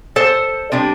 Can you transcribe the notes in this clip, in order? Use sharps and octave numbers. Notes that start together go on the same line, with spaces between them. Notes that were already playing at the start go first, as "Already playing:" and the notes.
A4 C5
C3 G3 D4